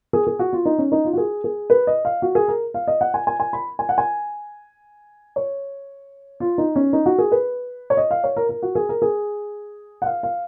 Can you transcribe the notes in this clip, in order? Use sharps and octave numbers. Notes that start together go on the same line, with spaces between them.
G#4
G#4
F#4
F4
D#4
C#4
D#4
F4
F#4
G#4
G#4
B4
D#5
F5
F#4
G#4
A#4
F5
D#5
F#5
G#5
G#5
G#5
B5
G#5
F#5
G#5
C#5
F4
D#4
C#4
D#4
F#4
G#4
B4
C#5
D#5
F5
C#5
A#4
A#4
F#4
G#4
A#4
G#4
F#5
F5
F5